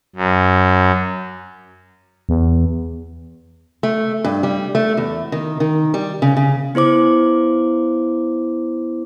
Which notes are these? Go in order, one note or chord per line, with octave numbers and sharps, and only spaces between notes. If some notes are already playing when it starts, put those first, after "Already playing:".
F#2
E2
A3
G2
G3
A3
E2
D#3
D#3
G3
C#3
C#3
B3 E4 C5 D6